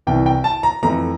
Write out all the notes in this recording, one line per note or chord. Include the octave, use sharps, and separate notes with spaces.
C2 C3 E3 G5
G5
A5
A#5
F2 E3 A3 A#5